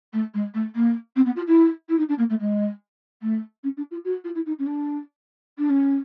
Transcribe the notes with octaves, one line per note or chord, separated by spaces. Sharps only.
A3
G#3
A3
A#3
C4
B3
F4
E4
E4
D#4
D4
A#3
A3
G#3
A3
C#4
D4
F4
F#4
F4
E4
D#4
C#4
D4
D4
C#4